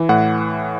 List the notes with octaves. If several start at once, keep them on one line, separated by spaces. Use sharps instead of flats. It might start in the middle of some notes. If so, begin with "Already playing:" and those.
Already playing: E3
A2 F#5